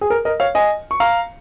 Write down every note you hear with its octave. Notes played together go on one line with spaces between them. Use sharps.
G#4
A#4
A#4 D#5
C#5 F5
D#5 G#5
C#6
F5 A#5